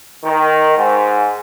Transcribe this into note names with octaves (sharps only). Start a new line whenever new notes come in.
D#3
G#2